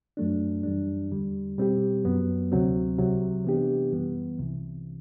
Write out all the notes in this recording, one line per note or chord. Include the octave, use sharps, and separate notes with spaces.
F#2 F#3 A3 D4
F#2 E3 G3 D4
E2 D3 G3
B2 G3 C4 G4
F#2 F#3 B3
D2 C3 F#3 C4
C2 C3 F#3
C3 E3 B3 D4 G4
F#2 E3 G3 B3
C2 C3 E3